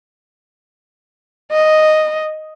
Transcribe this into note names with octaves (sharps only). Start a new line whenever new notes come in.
D#5